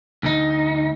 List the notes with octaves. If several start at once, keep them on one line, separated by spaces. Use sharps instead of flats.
D2 D#4